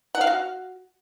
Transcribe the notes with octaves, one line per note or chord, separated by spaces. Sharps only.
F#5
F5
F#4